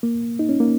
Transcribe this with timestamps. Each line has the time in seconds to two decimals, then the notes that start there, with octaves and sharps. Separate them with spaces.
0.03 A#3
0.39 D#4
0.49 C#4
0.60 A#3